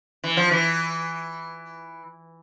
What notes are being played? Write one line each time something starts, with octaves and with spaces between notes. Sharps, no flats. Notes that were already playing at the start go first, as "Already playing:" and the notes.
E3
F3
E3